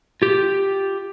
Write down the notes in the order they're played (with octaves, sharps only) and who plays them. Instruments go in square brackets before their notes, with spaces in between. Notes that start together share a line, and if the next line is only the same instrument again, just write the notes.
[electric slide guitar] F4 G4